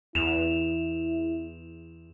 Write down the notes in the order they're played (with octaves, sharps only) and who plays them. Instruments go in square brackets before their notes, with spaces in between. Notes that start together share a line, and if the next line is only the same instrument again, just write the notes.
[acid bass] E2 [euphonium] E4 [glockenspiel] E7 F7